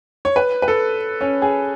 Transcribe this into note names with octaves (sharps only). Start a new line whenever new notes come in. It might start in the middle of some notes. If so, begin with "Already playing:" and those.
C#5
B4
B4
A4
C#4
G#4